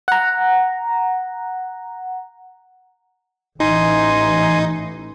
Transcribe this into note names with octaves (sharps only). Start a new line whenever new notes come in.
F#5 A#5
A1 E3 D#4 G#5 C6